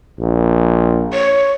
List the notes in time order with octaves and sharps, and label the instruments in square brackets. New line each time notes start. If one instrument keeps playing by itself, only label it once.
[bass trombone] A#1
[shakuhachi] C#5